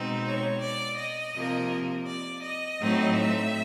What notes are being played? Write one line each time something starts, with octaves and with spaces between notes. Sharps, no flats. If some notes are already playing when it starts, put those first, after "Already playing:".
Already playing: B2 G#3 C4 D#4
C#5
D5
D#5
C3 F3 A#3
D5
D#5
A2 F#3 A3 C4 D#4
E5